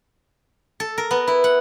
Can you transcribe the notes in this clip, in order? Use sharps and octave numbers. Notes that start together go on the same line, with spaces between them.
A4
A#4
B3
E4
F#5